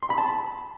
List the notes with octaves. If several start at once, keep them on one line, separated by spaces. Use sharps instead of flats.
C6
B5
A5